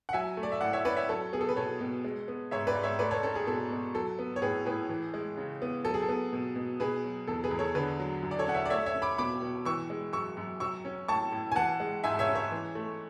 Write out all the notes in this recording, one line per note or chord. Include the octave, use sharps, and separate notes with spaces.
F#5
F#3 E5 G#5
A3
D5
E5
A2 D5 F#5
C#5 E5
C#4 B4 D5
C#5 E5
F#3 A4 C#5
B3 G#4
A4
B4
B2 A4 C#5
B2
G#3
B3
G#2 C#5 E5
B4 D5
G#2
C#5 E5
A3 B4 D5
A4 C#5
C#4 A4
G#4
B2 A4
B2
F#3 A4
B3
C#5
A2 G#4 B4
A2 G#4 B4
E3
G#3
C#3
B3
F#3 A4
G#4
A4
B3
B2
B2
B2 G#4 B4
F#3
E2 A4
G#4 B4
E2
A4 C#5
D3 G#4 B4
F#3
F#2
D5
A4 C#5
C#4 F#5
C#5 E5
D5
A3 C#5 E5
C#5 E5
C#4
B5 D6
B2 B5 D6
B2
E3 C#6 E6
G#3
F#2 C#6 E6
F#2
F#3 C#6 E6
C#4
A2 A5 C#6
A2
G#5
E3 F#5 A5
G#3
G#2 E5 G#5
C#5 E5
C#4
C#5 E5
E3
A3